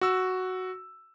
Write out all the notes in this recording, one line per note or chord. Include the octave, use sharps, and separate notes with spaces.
F#4 E6